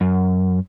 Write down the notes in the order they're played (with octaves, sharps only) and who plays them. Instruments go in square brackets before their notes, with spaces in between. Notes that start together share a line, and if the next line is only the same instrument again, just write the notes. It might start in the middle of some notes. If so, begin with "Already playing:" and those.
[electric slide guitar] F#2